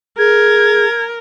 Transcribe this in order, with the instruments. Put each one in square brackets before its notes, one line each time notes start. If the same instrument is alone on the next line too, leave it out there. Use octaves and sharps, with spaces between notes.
[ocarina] G#4 [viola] A#4 [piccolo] G#6